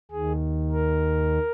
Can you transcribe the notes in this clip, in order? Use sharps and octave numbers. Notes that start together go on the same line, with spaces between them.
D#2 D#3 G#4
A#4